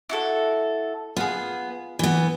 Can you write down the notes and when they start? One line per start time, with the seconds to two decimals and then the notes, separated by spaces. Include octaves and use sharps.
0.09 E4 F#4 A4
1.17 B3 F4 G#4
1.99 E3 B3